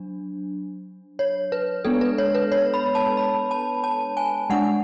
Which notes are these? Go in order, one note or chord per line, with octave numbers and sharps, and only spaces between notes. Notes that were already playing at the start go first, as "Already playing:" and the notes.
Already playing: F#3 D4
C#5
B4
G#3 B3 D4 A4
B4
C#5
B4
C#5
B5
A5
B5
A5
A5
G#5
G#3 D4 F#5